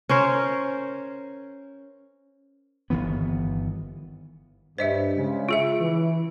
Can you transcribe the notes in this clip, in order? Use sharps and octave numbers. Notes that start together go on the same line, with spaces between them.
C#4 A#4 C5
G1 D#3 E3 B3
G2 C5 D#5 E5
C#3 G#3
F4 G#4 E5
E3